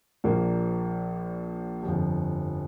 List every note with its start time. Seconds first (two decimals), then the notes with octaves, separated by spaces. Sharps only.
0.24 A#1 A#2 F3 A#3
1.83 G1 F2 F3